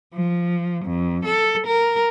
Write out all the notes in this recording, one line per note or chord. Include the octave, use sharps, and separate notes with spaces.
F3
F2
A4
A#4